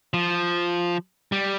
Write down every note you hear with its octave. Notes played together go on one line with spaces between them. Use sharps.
F3
G3